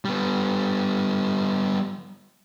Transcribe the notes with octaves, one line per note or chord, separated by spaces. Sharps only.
G3 B3